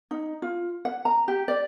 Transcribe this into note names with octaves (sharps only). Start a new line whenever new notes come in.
D#4
F4
F#5
A#5
G4
D5